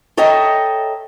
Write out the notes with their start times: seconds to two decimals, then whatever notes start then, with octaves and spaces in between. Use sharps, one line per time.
0.17 A4 C#5 D#5 E5 G5 A#5